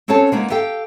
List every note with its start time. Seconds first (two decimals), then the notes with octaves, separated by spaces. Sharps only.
0.08 C4 C#4 F#4 A4 C#5 A5
0.32 G#3 A#3 B3 D#4
0.50 G4 A4 F5 G5